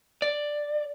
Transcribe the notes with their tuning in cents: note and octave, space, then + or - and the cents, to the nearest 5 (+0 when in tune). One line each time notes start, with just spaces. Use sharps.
D5 +5